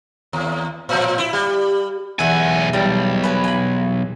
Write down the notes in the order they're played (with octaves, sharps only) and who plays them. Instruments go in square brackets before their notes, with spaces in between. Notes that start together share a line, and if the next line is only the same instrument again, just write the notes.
[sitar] D#2
A2 F3
E4
G3
[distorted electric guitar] B1 G#5 [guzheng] E2 E5 F#5
[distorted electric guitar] B1 [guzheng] G3
[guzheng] B4 G#5
G#5 B5